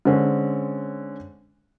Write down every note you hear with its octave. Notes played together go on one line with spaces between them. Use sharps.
D3 G#3 C4 C#4